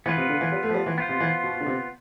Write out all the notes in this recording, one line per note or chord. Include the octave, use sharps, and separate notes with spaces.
E3 B3 F4 B4
C3
D3
E3
G3
A3
F3
G3
E3
B3 F4 C5
C3
E3
B2
D3
C3